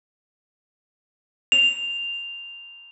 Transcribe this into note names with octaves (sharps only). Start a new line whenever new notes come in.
F7